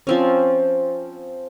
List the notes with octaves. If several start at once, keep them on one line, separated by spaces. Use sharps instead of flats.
F3 C4 C#4